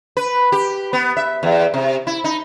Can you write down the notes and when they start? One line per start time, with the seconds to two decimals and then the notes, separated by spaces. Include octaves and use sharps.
0.17 B4
0.52 G4
0.93 B3
1.17 E5
1.43 E2
1.74 C3
2.07 E4
2.24 D#4